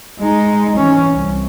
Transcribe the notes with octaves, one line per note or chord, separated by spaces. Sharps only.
G#3 D#4
E3 C#4
C2